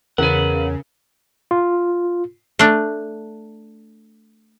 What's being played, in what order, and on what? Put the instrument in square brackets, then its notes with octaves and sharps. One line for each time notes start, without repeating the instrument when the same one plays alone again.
[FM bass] E2 [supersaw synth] C#3 [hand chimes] A#4 [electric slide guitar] B4 F#5
[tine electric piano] F4
[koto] A3 D4